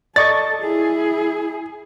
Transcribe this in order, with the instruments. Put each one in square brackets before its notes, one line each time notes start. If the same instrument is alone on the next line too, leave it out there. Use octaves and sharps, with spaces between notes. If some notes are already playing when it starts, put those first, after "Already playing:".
[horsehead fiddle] A4 [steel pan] D5 D#5 C#6 [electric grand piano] A6
[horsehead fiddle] E4 G#4